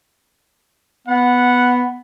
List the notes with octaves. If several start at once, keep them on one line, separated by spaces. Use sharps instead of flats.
B3 F#5